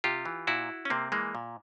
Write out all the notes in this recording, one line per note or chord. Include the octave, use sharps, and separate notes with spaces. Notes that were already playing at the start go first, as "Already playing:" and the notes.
C3 F4 G4
E3
A#2 E4 F#4
C#4
C3 A#3 C4
E3 G#3 A#3
A#2